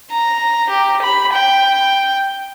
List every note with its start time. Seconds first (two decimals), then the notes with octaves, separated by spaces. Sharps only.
0.11 A#5
0.69 G4
1.02 B5
1.33 G5